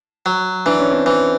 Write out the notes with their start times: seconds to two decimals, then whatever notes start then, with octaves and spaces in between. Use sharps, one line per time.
0.26 F#3
0.66 E3 D4
0.79 C#4
0.91 C4 D4
1.06 E3